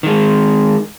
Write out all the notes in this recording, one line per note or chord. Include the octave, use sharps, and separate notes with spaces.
D#3 G#3